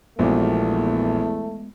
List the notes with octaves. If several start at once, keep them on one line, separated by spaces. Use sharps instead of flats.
A#1 E2 A#2 G#3 A3 B3 F#4